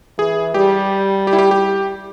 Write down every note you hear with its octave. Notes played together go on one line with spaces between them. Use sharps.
E3 G#4
G3 G4
G4
E4
G4
G4